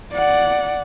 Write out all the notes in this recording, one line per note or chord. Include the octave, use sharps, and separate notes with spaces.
D5 F#5